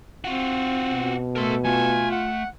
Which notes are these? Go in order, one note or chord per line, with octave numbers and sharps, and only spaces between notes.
C4 F4 F#4
B2
A3 A4 A#4 C6
A3 F4 G#5
F#5